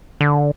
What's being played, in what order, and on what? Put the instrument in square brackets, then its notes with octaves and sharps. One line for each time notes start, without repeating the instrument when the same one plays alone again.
[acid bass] D3